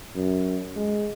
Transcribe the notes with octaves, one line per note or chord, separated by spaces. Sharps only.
F#2
G#3